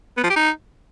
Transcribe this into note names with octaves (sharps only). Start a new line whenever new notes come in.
B3
F3
G4
D#4